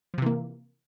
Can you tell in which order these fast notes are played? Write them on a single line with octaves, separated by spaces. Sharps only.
F3 C3 E3 A#3